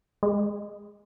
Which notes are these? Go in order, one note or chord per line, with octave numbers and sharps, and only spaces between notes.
G#3